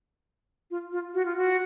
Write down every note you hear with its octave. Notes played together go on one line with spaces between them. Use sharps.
F4
F4
F#4
F4
F#4